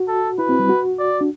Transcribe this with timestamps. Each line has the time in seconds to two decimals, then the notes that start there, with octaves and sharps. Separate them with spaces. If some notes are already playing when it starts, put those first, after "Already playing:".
Already playing: F#4
0.08 A4
0.38 E4 B4
0.49 C4
0.59 G3
0.69 F#4
0.99 D5
1.21 D4